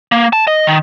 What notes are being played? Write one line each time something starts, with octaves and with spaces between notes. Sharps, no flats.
A#3
A5
D#5
D#3